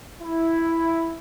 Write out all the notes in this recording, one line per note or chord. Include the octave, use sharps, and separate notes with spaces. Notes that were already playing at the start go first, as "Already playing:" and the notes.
E4